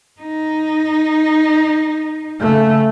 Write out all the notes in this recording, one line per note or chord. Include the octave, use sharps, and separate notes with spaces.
D#4
C#3 A3